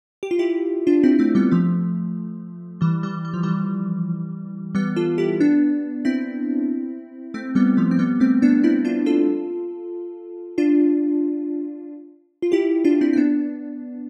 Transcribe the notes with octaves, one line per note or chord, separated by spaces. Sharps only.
G4
F4
E4 G4
D4 F4
C4 E4
A3 C4
G3 B3
F3 A3
E3 G3
E3 G3
G3
F3
E3 G3
G3 B3
F4 A4
E4 G4
B3 D4
C4 E4
A3 C4
G3 B3
F3 A3
C4
G3 B3
A3 C4
B3 D4
C4 E4
D4 F4
F4 A4
D4 F4
F4
E4 G4
D4 F4
C4 E4
C4
B3 D4